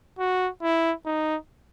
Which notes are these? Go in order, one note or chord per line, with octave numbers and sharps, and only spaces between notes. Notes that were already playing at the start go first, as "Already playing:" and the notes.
F#4
E4
D#4